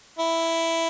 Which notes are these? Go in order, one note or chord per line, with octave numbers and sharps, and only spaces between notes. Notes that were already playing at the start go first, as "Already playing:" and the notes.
E4